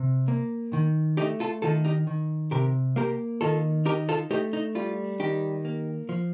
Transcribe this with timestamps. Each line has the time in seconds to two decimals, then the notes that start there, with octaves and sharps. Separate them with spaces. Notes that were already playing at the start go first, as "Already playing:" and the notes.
Already playing: C3
0.28 A#3
0.73 D#3
1.17 A3 D#4 G4
1.40 F4 A4
1.62 D#3 F4 A4
1.85 D#4 G4
2.07 D#3
2.51 C3 G4 A#4
2.96 A#3 G4 A#4
3.41 D#3 F4 A4
3.85 D#4 G4 A#4
4.09 F4 A4
4.31 A3 D#4 G4
4.53 D#4
4.75 G3 F4
5.20 D#3 D#4 G4
5.65 A#3
6.09 F3